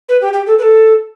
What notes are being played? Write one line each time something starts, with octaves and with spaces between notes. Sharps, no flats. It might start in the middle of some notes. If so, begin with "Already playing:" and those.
B4
G4
G4
A4
B4
A4